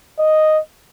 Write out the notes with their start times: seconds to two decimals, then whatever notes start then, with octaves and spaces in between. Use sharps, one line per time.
0.19 D#5